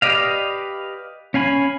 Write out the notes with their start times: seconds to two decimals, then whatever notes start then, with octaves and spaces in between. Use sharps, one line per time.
0.02 G4 B4 D5 D#5 F5
1.34 C#4 F5 G#5 B5